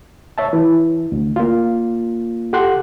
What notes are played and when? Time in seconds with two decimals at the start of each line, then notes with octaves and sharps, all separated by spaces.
0.38 C#5 E5 A5
0.53 E3
1.12 D2
1.36 A#3 F4
2.53 G4 A4 F#5 C6 F#6